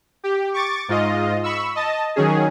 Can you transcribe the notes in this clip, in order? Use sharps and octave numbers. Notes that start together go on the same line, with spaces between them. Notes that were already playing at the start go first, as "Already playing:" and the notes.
G4
C#6 D6 A6
G#2 F4 D#5
B5 C#6 E6
D#5 A5
D#3 F#3 C#4 G#4